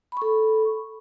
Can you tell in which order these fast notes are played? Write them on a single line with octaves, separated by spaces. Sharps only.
B5 C#6 A4